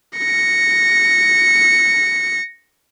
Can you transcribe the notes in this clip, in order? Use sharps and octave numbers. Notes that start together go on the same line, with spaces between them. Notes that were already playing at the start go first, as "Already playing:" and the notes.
A#6 C#7